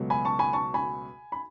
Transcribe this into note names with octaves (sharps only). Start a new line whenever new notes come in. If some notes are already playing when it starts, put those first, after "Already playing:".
Already playing: C#2 B2 F#3 A3
G#5 B5
A5 C#6
G#5 B5
A5 C#6
G#5 B5
B5